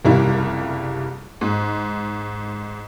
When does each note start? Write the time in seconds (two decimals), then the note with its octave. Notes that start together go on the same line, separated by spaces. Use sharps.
0.05 F#1 C2 G3 E4 F4
1.41 G#2